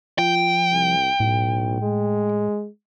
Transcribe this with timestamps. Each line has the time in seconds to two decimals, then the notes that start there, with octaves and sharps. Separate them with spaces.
0.19 F3 G5
0.71 C2
1.20 B1 A2
1.82 G#3